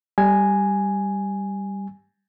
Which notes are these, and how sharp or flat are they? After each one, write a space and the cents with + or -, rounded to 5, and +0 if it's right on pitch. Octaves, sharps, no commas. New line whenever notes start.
G3 +0 G#5 +0